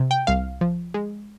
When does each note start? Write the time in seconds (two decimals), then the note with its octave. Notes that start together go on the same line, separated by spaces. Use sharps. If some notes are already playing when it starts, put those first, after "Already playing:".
Already playing: C3
0.11 G5
0.27 C2 F5
0.61 F3
0.94 G#3